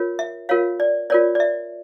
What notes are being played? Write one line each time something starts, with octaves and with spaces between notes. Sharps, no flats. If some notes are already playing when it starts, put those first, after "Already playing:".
Already playing: F4 A#4 C#5
E5
F4 A#4 C#5 F5
D5
F4 A#4 C#5 D5
D5
E5